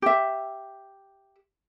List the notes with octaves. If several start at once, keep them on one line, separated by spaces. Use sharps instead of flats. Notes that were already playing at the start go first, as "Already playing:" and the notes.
G4 E5